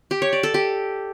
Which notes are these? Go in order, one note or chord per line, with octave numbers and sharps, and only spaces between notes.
G4
C#5
D5
A4
G4